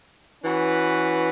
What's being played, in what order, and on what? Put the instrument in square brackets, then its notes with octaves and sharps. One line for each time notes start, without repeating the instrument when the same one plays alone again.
[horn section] E3 C#4 F#4 B4